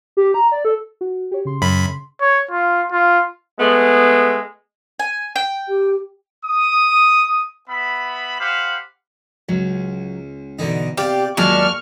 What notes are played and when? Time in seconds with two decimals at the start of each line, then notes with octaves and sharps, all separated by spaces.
0.17 G4
0.34 A#5
0.52 D5
0.65 A4
1.01 F#4
1.31 G4 C#5
1.45 C#3 C6
1.62 F#2 B5
2.21 C#5
2.51 F4
2.92 F4
3.59 G#3 A3 B3
4.99 G#5
5.36 G5
5.68 G4
6.44 D#6
7.69 B3 E5 B5
8.40 G4 C5 F5 F#5 B5
9.49 C#2 F#3
10.59 B2 D3 E3 D#4
10.97 C3 F4 G4 D5 F5
11.37 D#2 A#2 F#3 G#3 D4 D5 C#6 F6